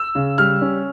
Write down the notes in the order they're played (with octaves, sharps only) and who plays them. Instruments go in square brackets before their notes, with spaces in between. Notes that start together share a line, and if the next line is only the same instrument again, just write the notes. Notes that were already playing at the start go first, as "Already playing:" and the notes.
Already playing: [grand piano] E6
C#3
G3 F6
C#4